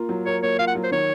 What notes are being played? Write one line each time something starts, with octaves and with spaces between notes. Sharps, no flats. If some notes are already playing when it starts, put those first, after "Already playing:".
Already playing: A#3 F4 A#4
F#3
A#4 C#5
A#3 C#5
F4 F5
F#5
F#3
C5
D#3 C#5